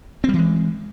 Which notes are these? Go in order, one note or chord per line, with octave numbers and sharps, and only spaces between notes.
E3 G3 G#3 C4